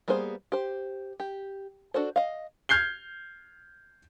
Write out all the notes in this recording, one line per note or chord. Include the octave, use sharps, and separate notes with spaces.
G3 A#3 B3 G#4 C5
G4 C5
G4
D4 F#4 A4 C5
D#5 F5
F6 G6 G#6 C7 G7